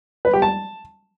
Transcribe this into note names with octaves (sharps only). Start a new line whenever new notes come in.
B4
G4
A5